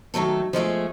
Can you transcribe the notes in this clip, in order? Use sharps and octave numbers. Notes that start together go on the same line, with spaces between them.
D#3 F#3 A3 A4
F3 G#3 A3 G#4